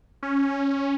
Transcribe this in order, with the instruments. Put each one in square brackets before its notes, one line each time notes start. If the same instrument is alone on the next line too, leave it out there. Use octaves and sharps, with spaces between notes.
[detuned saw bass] C#4